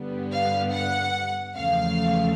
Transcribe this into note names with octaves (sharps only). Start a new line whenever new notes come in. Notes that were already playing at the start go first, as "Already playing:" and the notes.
Already playing: G2 D3 G3 B3
F5
F#5
E2 C#3 F3 A3 F5